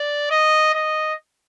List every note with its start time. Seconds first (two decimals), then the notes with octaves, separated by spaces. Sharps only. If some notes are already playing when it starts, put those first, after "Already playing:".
Already playing: D5
0.30 D#5
0.74 D#5